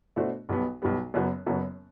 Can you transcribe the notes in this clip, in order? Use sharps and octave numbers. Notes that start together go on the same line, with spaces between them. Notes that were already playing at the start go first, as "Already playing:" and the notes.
B2 A3 D4 F#4 C5
B1 B2 G3 B3
B1 B2 G3 B3
F#1 F#2 F#3 B3 F#4
F#1 F#2 F#3 B3 F#4